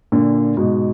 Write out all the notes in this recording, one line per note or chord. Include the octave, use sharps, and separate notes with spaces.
A#2 D3
G#2 B2